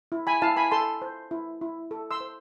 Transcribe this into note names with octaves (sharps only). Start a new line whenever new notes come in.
E4
G#5 B5
E4 F5 A5
G#5 B5
A4 A5 C6
C5
E4
E4
A4
C6 E6
C5